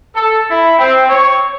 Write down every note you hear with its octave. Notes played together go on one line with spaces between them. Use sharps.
A4
E4
C4
C#5